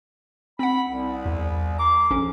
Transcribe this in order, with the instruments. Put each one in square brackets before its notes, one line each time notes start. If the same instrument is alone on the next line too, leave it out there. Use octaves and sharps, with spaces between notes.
[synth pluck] C4 F#5 [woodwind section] B5
[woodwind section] C2
[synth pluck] E2
[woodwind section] A#5 C6 D6
[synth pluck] A#1 C#4 A4